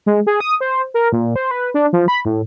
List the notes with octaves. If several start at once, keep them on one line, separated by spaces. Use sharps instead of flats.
G#3
G#4
D#6
C5
A#4
A#2
C5
B4
D4
F3
B5
A2